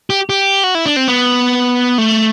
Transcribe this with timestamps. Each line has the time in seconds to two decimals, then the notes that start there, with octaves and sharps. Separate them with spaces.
0.10 G4
0.30 G4
0.64 F#4
0.75 E4
0.86 D4
0.96 C4
1.08 B3
1.98 A3